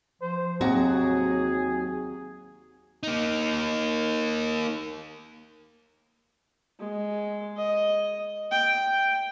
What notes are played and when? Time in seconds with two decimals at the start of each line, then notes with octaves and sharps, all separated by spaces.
0.21 F3 C5
0.61 D#2 F#3 C4 F#4 G#4 A#5
3.03 A#3 D#4
6.80 G#3
7.57 D#5
8.51 G5
8.91 G5